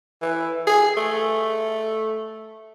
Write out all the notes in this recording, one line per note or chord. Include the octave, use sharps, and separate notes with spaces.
E3
G#4
A3